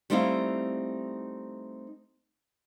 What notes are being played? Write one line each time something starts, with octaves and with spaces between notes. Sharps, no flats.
G3 A3 C4 D#4 E4 F5